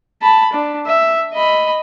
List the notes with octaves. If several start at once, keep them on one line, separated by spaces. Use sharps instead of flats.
A5 B5
D4
E5
D#5 B5